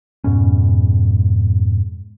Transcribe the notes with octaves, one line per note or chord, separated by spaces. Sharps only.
F2 G#2 B2 C#4